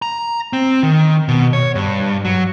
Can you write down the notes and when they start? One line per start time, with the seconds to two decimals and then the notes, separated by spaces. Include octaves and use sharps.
0.02 A#5
0.53 C4
0.83 D#3
1.28 B2
1.53 C#5
1.75 G2
2.25 F#3